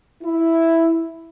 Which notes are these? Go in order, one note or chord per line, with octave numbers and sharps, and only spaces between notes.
E4